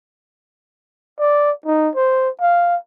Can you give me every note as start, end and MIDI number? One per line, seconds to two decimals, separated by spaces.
1.19 1.52 74
1.66 1.89 63
1.95 2.29 72
2.41 2.76 77